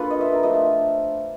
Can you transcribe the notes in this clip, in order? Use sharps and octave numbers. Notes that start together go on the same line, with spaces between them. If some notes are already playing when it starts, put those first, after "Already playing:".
Already playing: A#3 D4 F4 A4 B4
D#5
E5
A#4
F3 A3 D4 D#5
E5